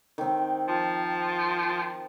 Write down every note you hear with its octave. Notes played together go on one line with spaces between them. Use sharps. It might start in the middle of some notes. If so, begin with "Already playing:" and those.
D#3 C4
F3